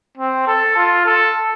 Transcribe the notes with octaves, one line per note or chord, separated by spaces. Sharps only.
C4
A4
F4
A4